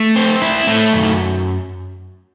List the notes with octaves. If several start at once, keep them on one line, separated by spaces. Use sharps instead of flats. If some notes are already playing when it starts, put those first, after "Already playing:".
Already playing: A3
C4
E4
A3
F#2